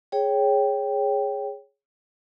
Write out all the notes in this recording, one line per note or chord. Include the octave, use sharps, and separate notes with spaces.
G#4 C#5 G5